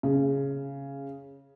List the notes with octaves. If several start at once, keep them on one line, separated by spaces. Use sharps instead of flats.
C#3